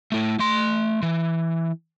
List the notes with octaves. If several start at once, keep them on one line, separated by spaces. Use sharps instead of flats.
A3 E4
A3 C6
E3